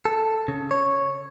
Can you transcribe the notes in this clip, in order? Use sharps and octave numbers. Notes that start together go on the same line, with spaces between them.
A4
C#3
C#5